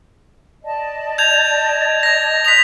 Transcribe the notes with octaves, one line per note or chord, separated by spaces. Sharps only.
D5 D#5 A5
G6 G#6 F7
G#6 A#6
C6 D#6 F#6 B6 F7